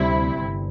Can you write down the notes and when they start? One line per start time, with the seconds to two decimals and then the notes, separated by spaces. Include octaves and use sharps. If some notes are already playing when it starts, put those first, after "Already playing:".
Already playing: D2 C3 G3 C4 E4
0.40 G1